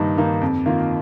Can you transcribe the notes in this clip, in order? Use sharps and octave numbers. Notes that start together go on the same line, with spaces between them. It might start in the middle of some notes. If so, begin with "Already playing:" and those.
Already playing: G2 D#3 A#3 D#4
D#3 A#3 D#4
F2
D#3 A#3 F4